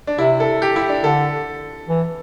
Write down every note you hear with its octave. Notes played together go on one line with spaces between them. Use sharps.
D4
C3 E4
A4
G4
E4
D4
D3 A4
E3